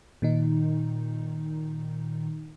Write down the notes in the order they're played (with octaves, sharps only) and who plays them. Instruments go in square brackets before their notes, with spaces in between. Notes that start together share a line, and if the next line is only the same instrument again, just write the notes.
[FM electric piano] A#2 D#3 D#4